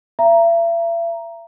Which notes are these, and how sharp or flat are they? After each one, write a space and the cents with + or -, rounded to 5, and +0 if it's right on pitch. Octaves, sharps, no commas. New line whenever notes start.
E5 +40 A#5 +0